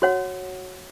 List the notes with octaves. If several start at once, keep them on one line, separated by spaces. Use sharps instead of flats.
F#4 C#5 F#5